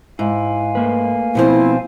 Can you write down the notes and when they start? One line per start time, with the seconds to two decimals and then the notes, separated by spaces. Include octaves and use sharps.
0.19 G#2 E4 F5 G#5
0.75 A3 A#3 B4
1.35 B2 F3 C4 E4